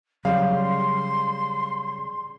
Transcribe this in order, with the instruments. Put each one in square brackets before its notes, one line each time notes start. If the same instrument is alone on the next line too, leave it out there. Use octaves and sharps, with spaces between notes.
[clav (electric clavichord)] C#3 G3 [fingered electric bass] F#3 [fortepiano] F5 [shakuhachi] C6